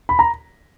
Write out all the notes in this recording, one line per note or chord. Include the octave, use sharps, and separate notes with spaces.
B5
A#5